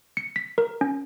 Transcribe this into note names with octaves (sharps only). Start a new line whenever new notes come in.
C#7
B6
A#4
C#4